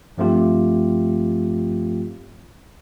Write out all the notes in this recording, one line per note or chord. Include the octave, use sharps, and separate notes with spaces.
G2 F3 A3 C4 F4 G4